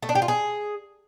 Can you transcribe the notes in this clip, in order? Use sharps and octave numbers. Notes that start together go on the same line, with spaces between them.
A3
D4
G4
F4
G#4